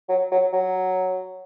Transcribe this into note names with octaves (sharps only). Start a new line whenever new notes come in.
F#3
F#3
F#3